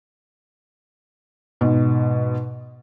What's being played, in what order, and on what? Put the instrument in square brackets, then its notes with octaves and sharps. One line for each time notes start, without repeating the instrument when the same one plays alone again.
[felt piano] G#2 B2